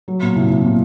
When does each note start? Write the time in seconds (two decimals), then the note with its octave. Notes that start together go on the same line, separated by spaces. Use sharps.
0.08 F#3
0.22 A#2
0.36 C2
0.50 C2
0.65 A#2